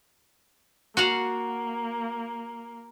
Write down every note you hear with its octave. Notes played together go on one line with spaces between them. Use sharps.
A#3 F#4 F5 F#5